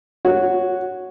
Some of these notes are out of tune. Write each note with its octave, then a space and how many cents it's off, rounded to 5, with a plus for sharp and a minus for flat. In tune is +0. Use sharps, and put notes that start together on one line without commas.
F#4 -5 C#5 +0